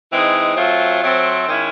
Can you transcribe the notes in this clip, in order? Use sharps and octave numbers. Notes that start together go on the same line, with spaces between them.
E3 G#3 C4 D#4 G#4
F#3 A3 C4 F4
F#3 A3 C4 F4
D#3 G#3 C#4 E4